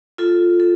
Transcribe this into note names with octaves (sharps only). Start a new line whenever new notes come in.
F4 A4
A4